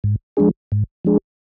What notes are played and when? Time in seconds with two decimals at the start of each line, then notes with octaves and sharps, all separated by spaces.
0.04 G#2
0.37 F3 G#3 D4 G#4
0.72 G#2
1.05 F3 G#3 D4 G#4